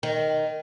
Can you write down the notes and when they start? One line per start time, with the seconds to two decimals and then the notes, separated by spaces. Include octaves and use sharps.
0.03 D#3